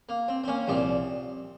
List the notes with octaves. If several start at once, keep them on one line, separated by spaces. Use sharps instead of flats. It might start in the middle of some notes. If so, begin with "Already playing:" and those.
A#3
C4
C4
A#3 C#4
C2 A#2 F3 C4